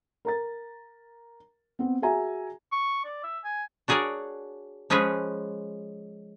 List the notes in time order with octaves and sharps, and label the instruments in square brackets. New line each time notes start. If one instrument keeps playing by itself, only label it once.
[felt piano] A#4 A#5 A6
B3 C4
F#4 G#4 E5 G#5 A#5
[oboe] C#6
D5
E5
G#5
[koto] D4 F#4 G#4 A#4 C#5 D5
F3 G#3 C#4 G#4 B4 C#5